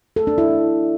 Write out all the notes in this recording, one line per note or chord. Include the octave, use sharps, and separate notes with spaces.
A4
D4
E4